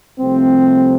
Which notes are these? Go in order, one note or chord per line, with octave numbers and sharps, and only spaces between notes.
C2 C3 F3 A3 C4